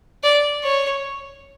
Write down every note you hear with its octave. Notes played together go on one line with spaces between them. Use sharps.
D5
C#5